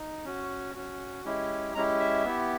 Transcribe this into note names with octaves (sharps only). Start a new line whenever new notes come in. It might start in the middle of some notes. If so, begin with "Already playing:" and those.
Already playing: D#4
C#4 F#4
C#4 F#4
G#3 C#4 E4 G4
G#3 C#4 E4 G4 A#5
E5
B3 E4 G4